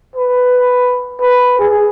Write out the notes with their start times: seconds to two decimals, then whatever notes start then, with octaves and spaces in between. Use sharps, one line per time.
0.16 B4
1.21 B4
1.59 G#4